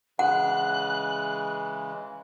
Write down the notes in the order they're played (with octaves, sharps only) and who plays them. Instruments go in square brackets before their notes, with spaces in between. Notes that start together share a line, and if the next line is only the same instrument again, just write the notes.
[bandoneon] C#3 E3 G#3 [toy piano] F#5 [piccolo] F#6